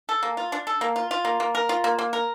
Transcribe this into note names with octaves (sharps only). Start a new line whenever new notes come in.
A4
A#3
F4
D4
A4
A#3
F4
F4
A#3
A#3
A#4
F4
A#3
A#3
A#4